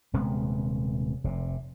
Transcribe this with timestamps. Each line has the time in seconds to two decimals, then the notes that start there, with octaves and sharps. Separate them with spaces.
0.13 D#1 C3 G#3 B3
1.24 F1 C3